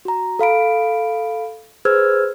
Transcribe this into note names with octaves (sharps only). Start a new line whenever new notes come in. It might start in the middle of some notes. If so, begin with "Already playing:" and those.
F#4 A#5
A4 F5 B5 D7
G#4 B4 C5 E6 F6 G#6